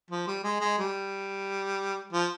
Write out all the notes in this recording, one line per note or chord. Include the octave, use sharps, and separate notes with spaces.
F3
G3
G#3
G#3
G3
F3